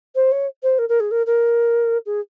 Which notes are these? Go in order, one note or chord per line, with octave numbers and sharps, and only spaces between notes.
C5
C#5
C5
A#4
A#4
G#4
A#4
A#4
G#4